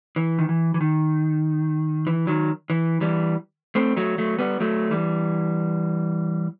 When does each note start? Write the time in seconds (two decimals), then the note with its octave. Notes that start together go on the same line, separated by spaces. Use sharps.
0.16 E3
0.39 D#3
0.49 E3
0.74 E3
0.81 D#3
2.07 E3
2.27 D#3 F#3
2.70 E3
3.01 E3 G3
3.75 A3 C4
3.97 F#3 A3
4.18 F#3 A3
4.39 G3 B3
4.60 F#3 A3
4.91 E3 G3